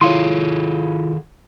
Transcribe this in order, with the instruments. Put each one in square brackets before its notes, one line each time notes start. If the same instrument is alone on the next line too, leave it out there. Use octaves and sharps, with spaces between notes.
[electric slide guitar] D#3 G#4 A4 [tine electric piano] E4 F4 [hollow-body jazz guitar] C#5 F5 C6